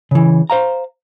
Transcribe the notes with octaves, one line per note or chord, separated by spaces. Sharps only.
C#3 E3
C5 F5 A#5